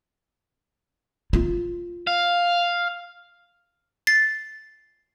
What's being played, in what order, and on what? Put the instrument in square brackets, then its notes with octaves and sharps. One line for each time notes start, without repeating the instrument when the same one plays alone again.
[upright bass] F4
[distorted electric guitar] F5
[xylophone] A6 C7